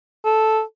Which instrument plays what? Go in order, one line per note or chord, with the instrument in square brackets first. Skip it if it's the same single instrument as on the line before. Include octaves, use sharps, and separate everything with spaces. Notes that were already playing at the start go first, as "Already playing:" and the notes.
[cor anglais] A4